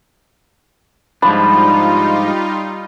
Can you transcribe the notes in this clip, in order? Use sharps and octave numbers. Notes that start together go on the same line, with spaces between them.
G#2 F3 G3 D4 D#4 F4 B5